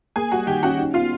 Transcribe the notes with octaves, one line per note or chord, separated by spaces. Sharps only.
A#3 G#4 G#5
G3 F#4 F#5
D#3 G4 G5
C#4 F#4 F#5
D#4
B3 F4 F5